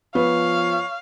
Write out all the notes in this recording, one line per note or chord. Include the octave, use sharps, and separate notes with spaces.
F3 B3 C#5 F5